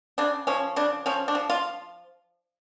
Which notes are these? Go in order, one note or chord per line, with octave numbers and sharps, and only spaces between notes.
C#3 D4
F3 C#4
C#3 D4
F3 C#4
D4
F3
F4